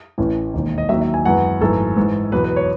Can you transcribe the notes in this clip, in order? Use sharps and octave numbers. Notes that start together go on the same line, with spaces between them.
A1 A2 E3 A3 C#4
E1 D#2 D#3
D#5
D#2 D#3 F#3 E5
E5
G#5
F#2 E3 G#3 B3 F#5
G#1 F#2 E3 A3 A4
G#2 E3 G#3
E2 B2 F#3 B4
B4
C#5